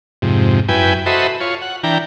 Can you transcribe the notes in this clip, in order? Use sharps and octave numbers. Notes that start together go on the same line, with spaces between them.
F2 G#2 C3
F#2 E4 B4 G5 G#5
F#4 A4 C5 D#5 E5 B5
F4 C#5
F#5
E3 D4 G5 A#5